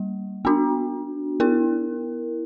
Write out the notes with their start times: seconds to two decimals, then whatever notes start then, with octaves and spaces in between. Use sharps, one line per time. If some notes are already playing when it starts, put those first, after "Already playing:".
Already playing: G3 A#3
0.45 B3 D4 F#4
1.40 B3 E4 A#4